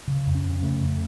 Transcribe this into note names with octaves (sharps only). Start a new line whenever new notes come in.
C#3
F2
C#4
F2
C#3 A3
F2